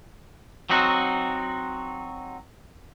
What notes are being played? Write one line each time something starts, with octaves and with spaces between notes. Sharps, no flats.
F#3 C4 D#4 F#4